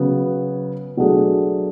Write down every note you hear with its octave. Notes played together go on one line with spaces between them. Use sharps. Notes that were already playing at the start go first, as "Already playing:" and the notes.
Already playing: C#3 F#3 B3
B2 F#3 A3 D4 G#4